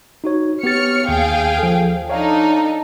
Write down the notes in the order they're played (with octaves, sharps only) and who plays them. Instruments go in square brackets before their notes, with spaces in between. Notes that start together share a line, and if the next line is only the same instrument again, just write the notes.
[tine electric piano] D#4 F#4 C#5
[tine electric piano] B3 G4 A6 [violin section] C#5 F6 C#7
[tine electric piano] D#2 [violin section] G#4 F5 G5
[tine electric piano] F3 A4
[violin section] D4 D#4 A4 [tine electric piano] C#5 F5